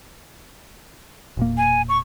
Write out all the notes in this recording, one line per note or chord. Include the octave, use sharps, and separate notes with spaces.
E1 A#2 A#3
G#5
C#6